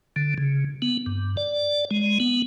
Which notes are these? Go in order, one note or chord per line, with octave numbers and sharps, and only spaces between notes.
D3
C#3
B3
G2
D5
G#3
B3